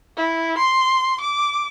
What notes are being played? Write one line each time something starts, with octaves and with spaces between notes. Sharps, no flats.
E4
C6
D6